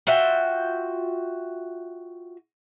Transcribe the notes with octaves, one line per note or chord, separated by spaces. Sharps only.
F4 F#4 E5 G5